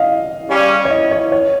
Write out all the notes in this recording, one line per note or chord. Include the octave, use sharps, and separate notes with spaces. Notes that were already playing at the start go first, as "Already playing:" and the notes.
Already playing: D#5 F5
C#3 G3 C#4
C#5
D#5
C#5
C#5